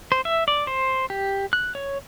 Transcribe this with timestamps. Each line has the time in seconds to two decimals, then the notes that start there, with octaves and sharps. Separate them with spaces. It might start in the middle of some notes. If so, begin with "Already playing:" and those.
0.12 C5
0.25 E5
0.48 D5
0.67 C5
1.10 G4
1.53 F#6
1.75 C#5